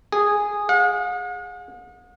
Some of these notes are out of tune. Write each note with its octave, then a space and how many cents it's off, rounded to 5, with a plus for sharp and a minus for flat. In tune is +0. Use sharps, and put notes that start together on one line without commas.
G#4 -10
F#5 -45